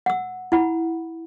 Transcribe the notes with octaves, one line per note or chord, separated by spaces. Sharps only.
F#5 E6
E4 F#5 B5